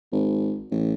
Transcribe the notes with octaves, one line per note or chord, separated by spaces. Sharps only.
G#1
A1